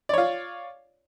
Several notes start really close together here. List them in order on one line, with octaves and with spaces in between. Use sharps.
D5 C#5 F4